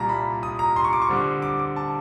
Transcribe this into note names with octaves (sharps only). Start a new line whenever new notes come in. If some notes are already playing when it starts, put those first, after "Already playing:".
Already playing: C2 A#2 G3 A5 A#5
B5
D#6
A#5
C6
C#6
D6
C#6
D3 G3 C4
D6
D6
A5